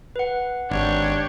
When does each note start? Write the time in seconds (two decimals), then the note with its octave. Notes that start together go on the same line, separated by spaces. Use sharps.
0.16 B4 F#5
0.71 G#1 D4 G4 C#5